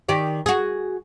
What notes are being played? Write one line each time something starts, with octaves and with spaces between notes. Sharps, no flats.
D#3 G4 D5
F#4 G#4